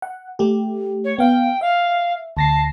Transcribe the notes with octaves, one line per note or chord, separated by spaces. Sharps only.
F#5
A3 G4
C#5
B3 F5 G5
E5 F5
D2 A5 A#6 C7